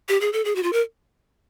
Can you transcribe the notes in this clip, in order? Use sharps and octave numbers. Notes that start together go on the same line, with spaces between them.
G4
G#4
A4
G#4
F#4
F4
A#4